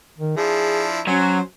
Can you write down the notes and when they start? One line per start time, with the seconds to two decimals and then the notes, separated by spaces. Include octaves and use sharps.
0.18 D#3
0.37 F3 D4 E4 G#4
1.07 F#3 C#4 C5 G#5